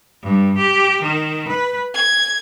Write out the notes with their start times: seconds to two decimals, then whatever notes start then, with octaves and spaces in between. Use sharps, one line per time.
0.22 G2
0.57 G4
1.02 D#3
1.48 B4
1.93 G#6